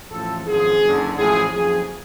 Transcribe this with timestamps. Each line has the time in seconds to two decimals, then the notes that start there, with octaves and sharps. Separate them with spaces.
0.11 A1 A2 F3 A4
0.47 G#1 F#2 F3 G#4
0.82 F#1 F#2 D3
1.18 A1 A2 F3 G#4
1.53 F#1 F2 C#3 F3 G#4